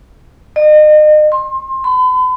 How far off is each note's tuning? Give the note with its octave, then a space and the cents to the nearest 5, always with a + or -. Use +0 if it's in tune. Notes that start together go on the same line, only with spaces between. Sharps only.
D#5 -35
C6 +25
B5 +45